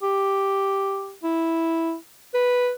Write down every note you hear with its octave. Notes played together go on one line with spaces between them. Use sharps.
G4
E4
B4